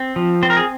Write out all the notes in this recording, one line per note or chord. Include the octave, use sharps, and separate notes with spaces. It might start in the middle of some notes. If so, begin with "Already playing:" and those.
Already playing: C4
F3
C4 C5
A#4
G#4